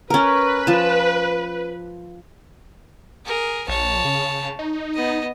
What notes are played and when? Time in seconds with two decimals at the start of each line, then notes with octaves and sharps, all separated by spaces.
0.10 C#4 A#4 B4
0.67 F3 A5
3.26 G#4 A#4
3.68 A#1 C#5 A5
4.05 C#3
4.59 D#4
4.94 B3 D#5